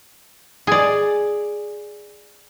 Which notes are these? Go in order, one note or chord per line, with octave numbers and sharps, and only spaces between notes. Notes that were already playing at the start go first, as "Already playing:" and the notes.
G#4 D5